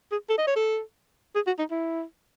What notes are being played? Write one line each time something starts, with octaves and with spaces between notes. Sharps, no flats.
G#4
A4
D#5
C#5
A4
G#4
F#4
D#4
E4